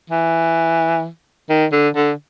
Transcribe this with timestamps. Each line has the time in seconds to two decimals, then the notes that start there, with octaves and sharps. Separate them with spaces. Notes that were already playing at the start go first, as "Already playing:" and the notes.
0.10 E3
1.49 D#3
1.72 D3
1.96 D3